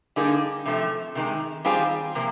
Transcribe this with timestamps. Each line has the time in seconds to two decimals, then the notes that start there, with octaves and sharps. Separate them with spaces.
0.16 D3 G3 A#3 D#4 G#4
0.66 C3 F3 A3
1.15 C3 D#3 G#3
1.65 D#3 G3 C4 F4 G#4
2.15 C3 F3 A#3